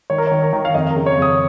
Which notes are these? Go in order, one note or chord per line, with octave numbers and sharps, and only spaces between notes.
D#3 C#5
A#4
C#5
D#3
A#4
D#3
F5
F2 D#5
A#4
C#3
C#5
F2 D#6